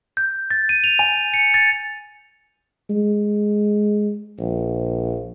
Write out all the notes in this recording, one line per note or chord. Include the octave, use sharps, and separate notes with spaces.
G6
A6
D#7
F7
G#5
C#7
A6
G#3
A#1